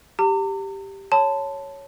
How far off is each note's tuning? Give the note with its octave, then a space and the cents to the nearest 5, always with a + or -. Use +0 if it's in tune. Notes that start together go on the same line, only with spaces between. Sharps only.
G4 +0 A#5 -45
C#5 +0 A5 +0 C6 -40